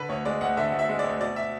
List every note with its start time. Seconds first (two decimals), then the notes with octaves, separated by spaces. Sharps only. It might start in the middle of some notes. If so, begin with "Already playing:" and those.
Already playing: D3 B4
0.09 D2 C#5
0.25 G#3 D5
0.41 D2 F#5
0.57 D3 E5
0.72 D2
0.79 E5
0.89 G#3
0.99 D5
1.04 D2
1.21 B2 D5
1.36 E5